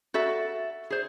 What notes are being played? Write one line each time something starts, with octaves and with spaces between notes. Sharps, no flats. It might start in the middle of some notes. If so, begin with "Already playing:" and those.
F#4 A4 E5
G#4 C5